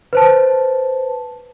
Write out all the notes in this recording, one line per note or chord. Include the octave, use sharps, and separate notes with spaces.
B4 C5 A5